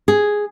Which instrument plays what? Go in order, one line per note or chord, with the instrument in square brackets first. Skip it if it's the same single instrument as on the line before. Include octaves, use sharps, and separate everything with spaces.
[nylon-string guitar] G#4